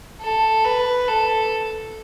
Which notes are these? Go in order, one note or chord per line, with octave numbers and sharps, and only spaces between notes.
A4
B4
A4